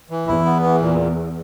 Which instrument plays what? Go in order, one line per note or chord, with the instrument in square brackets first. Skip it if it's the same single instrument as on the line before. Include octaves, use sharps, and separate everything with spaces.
[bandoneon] E3
[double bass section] E2 [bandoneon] E4
[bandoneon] B3
E3
A#2